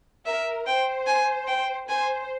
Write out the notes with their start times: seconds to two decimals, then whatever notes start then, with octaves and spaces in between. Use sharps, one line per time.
0.26 A#4 E5
0.67 C5 G5
1.07 G#5
1.47 G5
1.89 C5 G#5